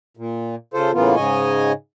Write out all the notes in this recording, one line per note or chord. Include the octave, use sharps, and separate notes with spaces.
A#2
C#3 F4 A4 C5
A2 C#3 E3 A#3 B3 F4
G#2 C#3 C#5 D#5 G#5